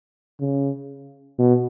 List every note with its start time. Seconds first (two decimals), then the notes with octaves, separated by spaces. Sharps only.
0.40 C#3
1.39 B2